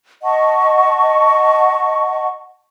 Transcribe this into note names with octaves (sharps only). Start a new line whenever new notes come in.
D#5 F#5 A5 C#6